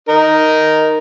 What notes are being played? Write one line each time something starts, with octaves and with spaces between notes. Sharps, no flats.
D#4 A#4